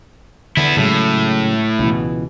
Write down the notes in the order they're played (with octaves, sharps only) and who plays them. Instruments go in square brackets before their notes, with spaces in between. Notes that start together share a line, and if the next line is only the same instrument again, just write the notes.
[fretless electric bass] D3 [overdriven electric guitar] B3 E4
[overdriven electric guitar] A2 [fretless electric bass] C#3 F#3 G#3
[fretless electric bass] C#2 B2 E3